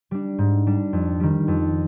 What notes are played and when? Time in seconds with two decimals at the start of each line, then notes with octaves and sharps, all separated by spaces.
0.11 G3 D4
0.38 G#2
0.67 G3 D4
0.93 F2
1.20 D#3 G3
1.48 F2